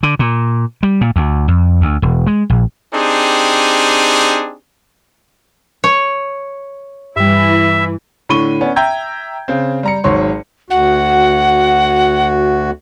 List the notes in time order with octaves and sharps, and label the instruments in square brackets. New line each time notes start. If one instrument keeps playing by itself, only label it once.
[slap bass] D3
A#2
G3
A#2
D2
F2
D2
E1
G#3
A#1
[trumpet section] C4 D4 D#4 G4 G#4
[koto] C#5
[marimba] G2 G3 [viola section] E3 E4 [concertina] E5
[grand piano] A2 D3 B5 C#6 D#7 G7
B3 C#4 D4
E5 G5 A#5 E6 G6 G#6
C#3 C4
G3 A#5 C#7
G#1 G#2 F#3 C#5 C6
[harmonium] D2 F#4 [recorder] F#5